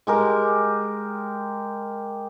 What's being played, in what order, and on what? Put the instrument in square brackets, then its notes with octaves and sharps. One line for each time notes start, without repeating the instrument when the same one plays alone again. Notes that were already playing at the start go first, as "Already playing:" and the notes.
[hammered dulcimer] G#3 G4 A#4